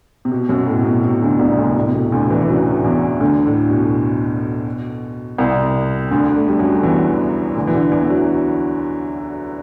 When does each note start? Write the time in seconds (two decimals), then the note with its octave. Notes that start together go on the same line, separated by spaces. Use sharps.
0.25 C3
0.32 B2
0.49 F#2 F#3
0.67 A2
0.79 C3
0.85 B2
1.04 B2
1.21 D2 D3
1.39 C2 C3
1.58 D2 D3
1.76 A2
1.87 C3
1.94 B2
2.12 D2 D3
2.30 E2 E3
2.42 E3
2.48 F#2 F#3
2.84 E2 E3
3.20 D2 D3
3.46 A2
3.70 B2
5.38 C2 C3
6.11 D2 D3
6.37 A3
6.48 G3
6.59 F#2 F#3
6.83 E2 E3
7.55 D2 D3
7.67 E3
7.73 D2 D3
7.92 E2 E3
8.10 F#3